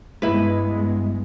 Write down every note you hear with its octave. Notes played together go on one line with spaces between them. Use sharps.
G2 G#3 B3 E4 B4